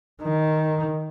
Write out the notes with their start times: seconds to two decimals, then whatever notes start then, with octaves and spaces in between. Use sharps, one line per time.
0.23 D#3